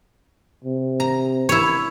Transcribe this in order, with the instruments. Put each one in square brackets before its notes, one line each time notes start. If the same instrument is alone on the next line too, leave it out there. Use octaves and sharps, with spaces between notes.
[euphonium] C3
[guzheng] A#5
E4 C#5